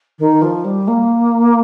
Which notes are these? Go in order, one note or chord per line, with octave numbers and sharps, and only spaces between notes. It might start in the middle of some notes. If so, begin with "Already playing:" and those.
D#3
F3
G3
A#3